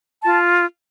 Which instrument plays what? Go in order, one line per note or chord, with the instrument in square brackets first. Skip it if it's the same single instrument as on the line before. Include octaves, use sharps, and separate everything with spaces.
[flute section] F4 A5